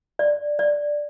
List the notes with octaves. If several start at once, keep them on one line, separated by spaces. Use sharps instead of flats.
D5
D5